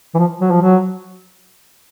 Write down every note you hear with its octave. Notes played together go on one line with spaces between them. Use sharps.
E3
F3
F#3
F3
F#3